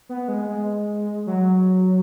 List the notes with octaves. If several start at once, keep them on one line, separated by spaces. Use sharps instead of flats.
B3
G#3
G#3
F#3